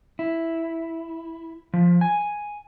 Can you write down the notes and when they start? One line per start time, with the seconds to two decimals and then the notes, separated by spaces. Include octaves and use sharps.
0.19 E4
1.73 F3
2.01 G#5